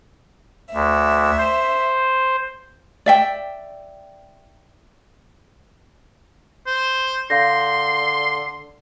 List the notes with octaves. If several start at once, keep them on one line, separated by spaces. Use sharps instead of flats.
D2 E5
C5
D5 E5 G5
C5
D3 F5 C6 G6 A#6